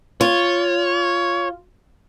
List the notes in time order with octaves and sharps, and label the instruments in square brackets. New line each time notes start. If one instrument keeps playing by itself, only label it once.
[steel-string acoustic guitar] F4 [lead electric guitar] C#5